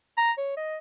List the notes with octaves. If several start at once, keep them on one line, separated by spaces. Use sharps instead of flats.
A#5
C#5
D#5